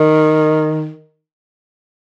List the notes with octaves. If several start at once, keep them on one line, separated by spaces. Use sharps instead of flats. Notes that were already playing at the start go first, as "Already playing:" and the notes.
Already playing: D#3